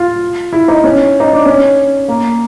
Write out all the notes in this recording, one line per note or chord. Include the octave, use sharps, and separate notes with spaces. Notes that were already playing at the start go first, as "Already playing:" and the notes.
Already playing: F4
E4
D#4
C#4
D#4
D4
C#4
A#3